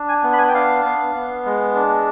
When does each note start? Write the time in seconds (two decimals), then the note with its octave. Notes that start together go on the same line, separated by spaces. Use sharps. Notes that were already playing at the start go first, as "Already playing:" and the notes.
Already playing: D4
0.09 G#5
0.23 B3
0.33 B5
0.38 G#5
0.49 G5
0.53 D4 F5
0.84 B3
1.15 B3
1.45 G#3
1.75 D4